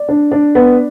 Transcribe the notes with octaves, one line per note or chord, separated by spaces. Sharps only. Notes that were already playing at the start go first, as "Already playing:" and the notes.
Already playing: D5
D4
D4
B3